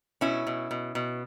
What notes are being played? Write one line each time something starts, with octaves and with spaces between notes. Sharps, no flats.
B2 C#4 E4
B2
B2
B2